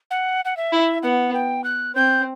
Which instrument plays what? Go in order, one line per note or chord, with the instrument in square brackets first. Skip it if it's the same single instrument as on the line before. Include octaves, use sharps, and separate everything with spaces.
[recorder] F#5
F#5
E5
[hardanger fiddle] E4
[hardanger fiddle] B3 [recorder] F#5
[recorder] G5
F#6
[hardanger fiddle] C4 [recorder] G6